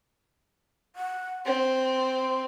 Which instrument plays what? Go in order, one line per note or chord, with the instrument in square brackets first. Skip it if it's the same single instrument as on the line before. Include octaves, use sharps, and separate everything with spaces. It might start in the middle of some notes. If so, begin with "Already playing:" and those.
[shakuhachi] F#5
[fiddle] C4 [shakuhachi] C6